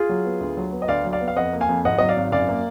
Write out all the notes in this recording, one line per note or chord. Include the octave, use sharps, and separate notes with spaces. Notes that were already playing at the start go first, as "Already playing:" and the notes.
Already playing: F4 G#4
F#3
B3
D2
F#3
B3
D#5
D2 D5 F5
F#3
D5 F5
B3
F5
F2 D#5 F#5
A#3
F5 G#5
F2
G#1 D#5 F#5
F#3 D#5
D5 F5
G#1
F#2 D5 F5
A#3